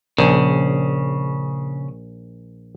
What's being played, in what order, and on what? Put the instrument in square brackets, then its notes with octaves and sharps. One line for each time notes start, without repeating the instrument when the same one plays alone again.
[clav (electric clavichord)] A#1 [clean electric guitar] C#3